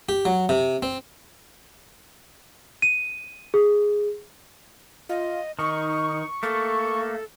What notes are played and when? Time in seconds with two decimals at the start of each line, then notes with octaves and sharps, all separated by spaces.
0.09 G4
0.25 F#3
0.49 C3
0.83 C4
2.82 D#7
3.54 G#4
5.09 F4 D#5
5.59 D#3 D#4 C#6
6.43 A3 A#3 A4